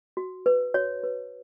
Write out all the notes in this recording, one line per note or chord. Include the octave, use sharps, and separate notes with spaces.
F#4
B4
F#4 C#5
B4